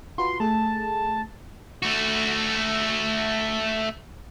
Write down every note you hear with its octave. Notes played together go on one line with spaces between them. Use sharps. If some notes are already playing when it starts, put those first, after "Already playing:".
F4 F#4 B4 C6
A3 G#4 A5
A3 F#4